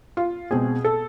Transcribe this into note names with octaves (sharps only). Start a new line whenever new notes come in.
F4
B2 G#3 C4 G#4
A4